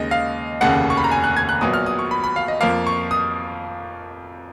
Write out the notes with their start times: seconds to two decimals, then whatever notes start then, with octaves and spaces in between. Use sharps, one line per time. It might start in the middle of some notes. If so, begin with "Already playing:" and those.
Already playing: D#2 C#3 G#3 D#5
0.11 F5
0.61 F1 D#2 C#3 F#5
0.90 C#6
0.97 B5
1.04 A#5
1.11 G#5
1.24 F#6
1.36 G#6
1.49 F#6
1.61 A#1 A#2 F#3 B3 D#6
1.74 F6
1.86 D#6
1.99 C#6
2.11 B5
2.24 B5
2.36 F5
2.48 D#5
2.61 F2 F3 A#3 F5
2.87 C#6
3.11 D#6